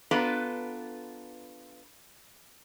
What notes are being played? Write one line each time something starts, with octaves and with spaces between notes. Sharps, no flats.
B3 D4 F4 A4 B4 A#5